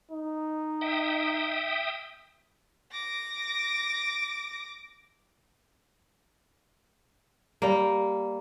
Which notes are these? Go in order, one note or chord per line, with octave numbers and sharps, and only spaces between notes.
D#4
E5 G5 D#6
D6 A#6
G3 A#3